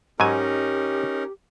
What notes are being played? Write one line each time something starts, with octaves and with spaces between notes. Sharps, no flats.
G#2 F#3 C#4 D#4 G4 A#4 G#5